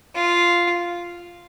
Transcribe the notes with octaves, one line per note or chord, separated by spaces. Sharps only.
F4